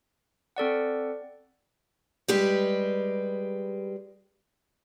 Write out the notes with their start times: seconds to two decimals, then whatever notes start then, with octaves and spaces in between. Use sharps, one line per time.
0.56 C4 A4 D5 F#5
2.28 G3 G#3 G4 B4